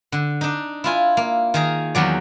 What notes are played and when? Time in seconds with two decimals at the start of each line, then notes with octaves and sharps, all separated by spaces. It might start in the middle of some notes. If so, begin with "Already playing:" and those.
0.12 D3
0.41 D4 D#4
0.84 E4 F4 G#5
1.17 A#3
1.54 D#3 G#4 A#5
1.95 E2 D#3 F#3 D5